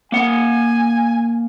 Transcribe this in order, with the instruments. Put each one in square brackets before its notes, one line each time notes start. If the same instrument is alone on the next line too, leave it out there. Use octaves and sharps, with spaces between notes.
[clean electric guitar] A#3 F#5 [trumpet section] G#5